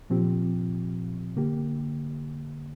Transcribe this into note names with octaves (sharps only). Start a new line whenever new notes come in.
A#2 F3 C4 G4
D3 A#3 G4